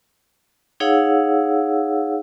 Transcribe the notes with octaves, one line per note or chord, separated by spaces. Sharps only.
D#4 G#4 C#5 F5 F#5 E6